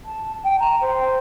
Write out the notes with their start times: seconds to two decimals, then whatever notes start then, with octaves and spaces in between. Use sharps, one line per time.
0.05 A5
0.44 G5
0.60 A#5
0.81 C5